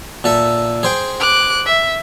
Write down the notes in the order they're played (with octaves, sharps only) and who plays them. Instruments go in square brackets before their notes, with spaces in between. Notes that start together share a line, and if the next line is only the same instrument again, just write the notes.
[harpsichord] A#2 A4 E5
G#4 C5 G5
[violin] D6 F#6
E5